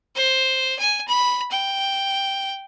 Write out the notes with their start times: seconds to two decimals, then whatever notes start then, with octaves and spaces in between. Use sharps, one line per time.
0.16 C5
0.79 G#5
1.08 B5
1.51 G5